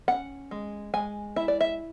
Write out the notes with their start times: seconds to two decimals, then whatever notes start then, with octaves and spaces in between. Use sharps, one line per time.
0.08 C#4 F#5
0.51 G#3
0.94 G#3 G#5
1.36 E4 E5
1.48 D5
1.61 E5